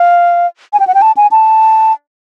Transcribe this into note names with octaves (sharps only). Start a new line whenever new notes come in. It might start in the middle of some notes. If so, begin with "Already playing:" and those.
Already playing: F5
G#5
G5
F#5
G5
A5
G#5
A5